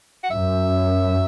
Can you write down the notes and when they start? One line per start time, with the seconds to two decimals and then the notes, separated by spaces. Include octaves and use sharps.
0.23 F#5
0.30 F#2 E5